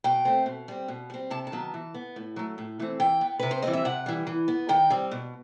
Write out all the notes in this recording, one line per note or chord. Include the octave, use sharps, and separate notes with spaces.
B2 G5
A3 C4
B2
G3 C4
B2
G3 C4
C3 A5
A5
D#3 F#3 B3
E3
B3
A2
F#3 A3
A2
E3 A3 C4
E3 G5
B3
C3 B4
C5
E3 G3 C4 D#5
E5
C3 F#5
E3 G3
E3
B3
D#3 G5
G3 C4
B2